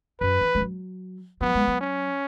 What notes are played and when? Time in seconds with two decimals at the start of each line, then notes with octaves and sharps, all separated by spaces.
0.20 F#2 B4
0.41 E3
0.55 G#3
0.60 F#3
1.40 F#3 B3
1.55 G#3
1.68 F#3
1.81 C#4